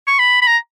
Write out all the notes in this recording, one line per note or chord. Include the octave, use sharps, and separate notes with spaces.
C#6
B5
B5
A#5